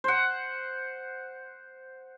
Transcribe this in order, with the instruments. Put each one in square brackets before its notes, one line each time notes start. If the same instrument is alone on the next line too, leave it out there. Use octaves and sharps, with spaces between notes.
[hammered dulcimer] C5 F#5